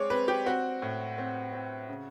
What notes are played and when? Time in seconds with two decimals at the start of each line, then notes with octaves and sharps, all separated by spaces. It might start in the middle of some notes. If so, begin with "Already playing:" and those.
Already playing: G#3 C4 C#5 D5
0.10 C4 B4
0.28 G4
0.46 C4 F#4
0.82 A2
1.18 C4
1.53 C4
1.89 C#3